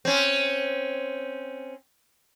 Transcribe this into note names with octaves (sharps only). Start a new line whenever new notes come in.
C4 C#4